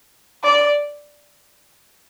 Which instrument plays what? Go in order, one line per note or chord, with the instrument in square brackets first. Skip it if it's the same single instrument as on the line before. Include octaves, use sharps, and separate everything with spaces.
[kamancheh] D5